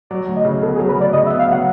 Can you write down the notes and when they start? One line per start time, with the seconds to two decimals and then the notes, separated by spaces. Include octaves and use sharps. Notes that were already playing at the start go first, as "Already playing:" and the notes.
0.10 F#3 D5
0.27 D2
0.36 D#5
0.45 C#3
0.61 B3 A4
0.75 G#4
0.79 F#3
0.88 B4
0.96 D2 D5
1.12 C#3 D#5
1.26 E5
1.30 B3
1.39 F5
1.48 F#3 F#5